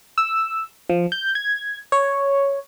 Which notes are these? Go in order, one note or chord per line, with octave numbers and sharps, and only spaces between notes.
E6
F3
G6
G#6
C#5